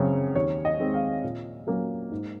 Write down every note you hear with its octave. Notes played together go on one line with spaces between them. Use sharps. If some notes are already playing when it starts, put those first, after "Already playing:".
Already playing: F#2 C#3 F#3 C4 C#5
D#2 C#5
D#5
D#3 G#3 C4
F5
A#2
F#3 A#3 C#4
G#2